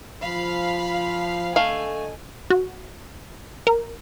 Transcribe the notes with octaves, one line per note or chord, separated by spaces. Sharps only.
F3 F5 B5
D3 A3 A4 D#5 F5 G#5
F#4
A#4